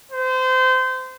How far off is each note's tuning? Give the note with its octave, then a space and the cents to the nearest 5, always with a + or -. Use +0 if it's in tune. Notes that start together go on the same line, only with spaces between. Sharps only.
C5 -25